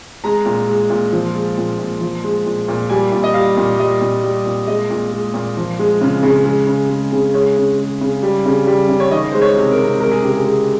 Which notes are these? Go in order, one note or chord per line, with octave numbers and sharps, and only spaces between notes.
G#3 A#5
A#2
G#3
A#2
F3
G#3
A#2
A#2
F3
G#3
A#2
A#2
G3 G#5
A#2
D#5
G3 F5
A#2
G3 D#5
A#2
G3
A#2
G#3 D#5
A#2
G#3
A#2
F3
G#3
C#3
C#3
G#3
C#3
G#3
C#3
G#3 C#5
C#3
G#3
C#3
G3
C#3
G3
C#3
C#5
D#3 D#5
G#3 C5
C#5
C3
A#4
C3
G#3 A#4
G#4
C#3 G4
G#4
G#3